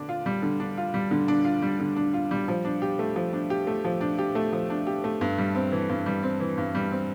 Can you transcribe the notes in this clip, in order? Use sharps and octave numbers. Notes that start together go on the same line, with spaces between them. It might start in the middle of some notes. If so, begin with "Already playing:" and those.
Already playing: D3 D4
F4
G3
D3
D4
F4
G3
D3
D4
F4
G3
D3
D4
F4
G3
F3
D4
G4
A3
F3
D4
G4
A3
F3
D4
G4
A3
F3
D4
G4
A3
G2
G3
C4
E3
G2
G3
C4
E3
G2
G3
C4